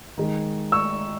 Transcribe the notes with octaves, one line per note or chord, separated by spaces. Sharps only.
D#3 G#3
C#6 E6